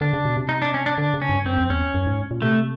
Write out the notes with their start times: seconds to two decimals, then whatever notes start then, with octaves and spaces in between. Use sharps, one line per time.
0.01 D3 D4
0.13 C#3
0.25 B2
0.37 C3
0.49 D#4
0.62 D4
0.74 C#4
0.86 D4
0.97 D3 D4
1.14 C#3
1.22 C#4
1.29 G2
1.46 F#2 C4
1.58 F2
1.70 E2 C#4
1.94 F#2
2.07 G#2
2.31 A#2
2.42 C3 A3